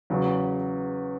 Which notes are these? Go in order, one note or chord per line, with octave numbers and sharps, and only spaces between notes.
E2 C#3 F#3